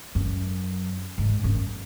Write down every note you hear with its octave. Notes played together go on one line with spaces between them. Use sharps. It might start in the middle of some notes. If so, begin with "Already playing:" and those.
F#2
G#2
F#2